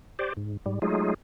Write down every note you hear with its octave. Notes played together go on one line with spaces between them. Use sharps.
G4 C5 D5
G#2
G#2 G3
F#3 G#3 A3 D#4 F4 G#4